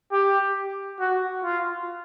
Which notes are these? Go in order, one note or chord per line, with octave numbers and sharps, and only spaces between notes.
G4
F#4
F4